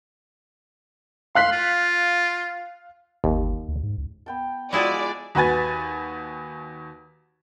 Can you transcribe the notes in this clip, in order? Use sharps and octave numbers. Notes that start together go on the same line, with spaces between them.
F5 C6 F#6 B6
F4
G1 D#2
D2
G#2
C#2
B3 G5 A5
F3 G#3 E4 F#4 G#4 D5 B5
D#2 F#4 B4 G#5 A6